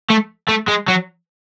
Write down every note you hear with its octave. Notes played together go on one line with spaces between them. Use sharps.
A3
A3
G#3
F#3